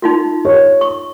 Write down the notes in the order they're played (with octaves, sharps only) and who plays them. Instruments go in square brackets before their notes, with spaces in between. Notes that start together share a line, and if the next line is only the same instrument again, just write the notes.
[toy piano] D#4 F4 F#4
[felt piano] C#5
[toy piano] C#6